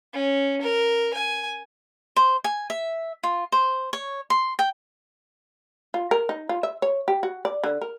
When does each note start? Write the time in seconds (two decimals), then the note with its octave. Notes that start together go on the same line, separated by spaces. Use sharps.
0.13 C#4
0.62 A#4
1.14 G#5
2.16 C5
2.44 G#5
2.70 E5
3.23 F4
3.52 C5
3.93 C#5
4.30 C6
4.59 G5
5.94 F4
6.11 A#4
6.29 D#4
6.49 F4
6.63 E5
6.82 C#5
7.08 G4
7.23 F#4
7.45 D5
7.64 D3
7.81 A#4